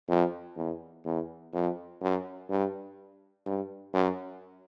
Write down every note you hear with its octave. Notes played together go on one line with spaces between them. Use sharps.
F2
E2
E2
F2
F#2
G2
G2
F#2